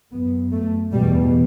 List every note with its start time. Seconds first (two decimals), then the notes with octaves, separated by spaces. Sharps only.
0.13 F#2 B3
0.53 A3
0.92 E2 B2 G3